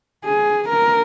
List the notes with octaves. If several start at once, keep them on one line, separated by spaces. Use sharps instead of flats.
G#4
A#4